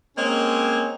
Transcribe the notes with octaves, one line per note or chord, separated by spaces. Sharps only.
G#3 A#3 C4 C#4 C#5 D#5